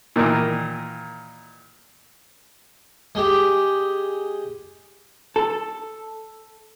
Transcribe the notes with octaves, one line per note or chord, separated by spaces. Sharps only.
A#2 D#3 E3
G#3 G4
A4